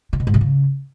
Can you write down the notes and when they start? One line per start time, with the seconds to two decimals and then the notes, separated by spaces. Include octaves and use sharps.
0.13 C3
0.20 B2
0.27 G#2
0.34 C3
0.41 C#3